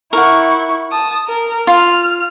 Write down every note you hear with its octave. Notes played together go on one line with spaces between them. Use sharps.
E4 A#4 F#5 C#6
A5 D#6
A#4
F4 F6